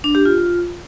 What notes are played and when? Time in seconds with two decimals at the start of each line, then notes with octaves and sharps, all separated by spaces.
0.04 D4
0.15 G4
0.25 F4